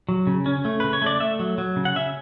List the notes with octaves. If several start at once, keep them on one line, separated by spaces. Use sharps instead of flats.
F#3
C#3
C#4
A3
C#3 B4
C#5
A3 D5
A3 E5
F#3
F#3
C#3
F#5
C#4 E5